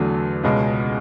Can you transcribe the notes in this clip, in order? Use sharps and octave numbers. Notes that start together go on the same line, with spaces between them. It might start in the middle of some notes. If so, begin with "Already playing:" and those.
Already playing: E2 D3 F#3 A3
C#2 B2 G#3 C#4